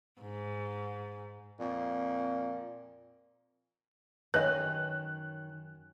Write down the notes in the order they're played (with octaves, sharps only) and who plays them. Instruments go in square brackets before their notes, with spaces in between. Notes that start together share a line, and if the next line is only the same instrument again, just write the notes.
[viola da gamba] G#2
[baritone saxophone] F2 [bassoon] A#2
[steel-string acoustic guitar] F#2 C#5 G#5 [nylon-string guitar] D#3 [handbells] B4 D#5 [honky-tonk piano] F#6